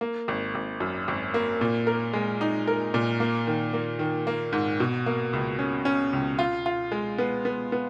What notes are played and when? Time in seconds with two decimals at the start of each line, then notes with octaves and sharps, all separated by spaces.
0.01 A#3
0.28 G#1
0.55 G#1
0.80 F#2
1.08 G#1
1.34 A#3
1.61 A#2
1.87 A#4
2.13 G#3
2.41 D#4
2.67 A#4
2.94 A#2
3.20 A#3
3.47 D#3
3.73 A#3
3.99 D#3
4.27 A#3
4.53 G#2
4.80 B2
5.06 A#3
5.33 C#2
5.59 C#4
5.85 C#4
6.13 C#2
6.39 F4
6.66 F4
6.92 G#3
7.18 B3
7.45 B3
7.72 B3